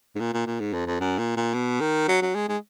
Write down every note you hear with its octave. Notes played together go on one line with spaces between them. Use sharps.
G#2
A#2
A#2
A#2
G#2
F2
F2
F#2
A#2
A#2
B2
D#3
F#3
F#3
G#3
G#3